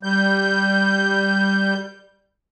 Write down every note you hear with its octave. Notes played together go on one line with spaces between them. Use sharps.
G3 G6